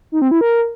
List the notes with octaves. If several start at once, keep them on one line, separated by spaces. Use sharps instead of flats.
D#4
C4
E4
A#4